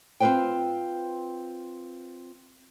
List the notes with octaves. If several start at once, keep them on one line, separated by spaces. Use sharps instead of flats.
C4 F4 G#4 B4 C5 G5